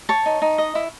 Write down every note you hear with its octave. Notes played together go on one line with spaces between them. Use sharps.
C#5 A5 C#6
D#4
D#4
D#5
E4